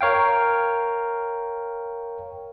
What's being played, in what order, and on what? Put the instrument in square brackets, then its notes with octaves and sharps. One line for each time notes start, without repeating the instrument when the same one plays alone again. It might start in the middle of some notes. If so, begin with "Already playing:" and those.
[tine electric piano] A#4 C#5 F5 G5